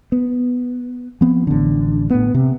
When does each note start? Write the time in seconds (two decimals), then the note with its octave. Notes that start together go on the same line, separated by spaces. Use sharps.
0.12 B3
1.21 F3 B3 C4
1.47 A1 D3
2.10 A2 B3
2.35 C3